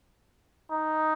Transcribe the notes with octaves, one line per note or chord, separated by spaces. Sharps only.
D#4